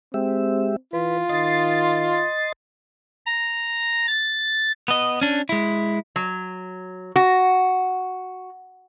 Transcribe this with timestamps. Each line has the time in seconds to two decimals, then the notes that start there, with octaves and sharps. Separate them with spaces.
0.14 G#3 C4 G4 E5
0.93 E3 F4 B4
1.29 D#3 D#5 C6 A6
3.26 A#5
4.07 A6
4.88 B3 D#5
5.21 C#4 D4
5.49 G#3 E4
6.16 F#3
7.16 F#4